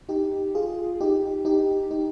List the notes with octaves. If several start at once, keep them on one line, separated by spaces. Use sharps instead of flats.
D#4 G4
F4 G#4
D#4 G4
D#4 G4
D#4 G4